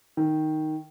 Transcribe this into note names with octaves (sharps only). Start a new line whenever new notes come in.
D#3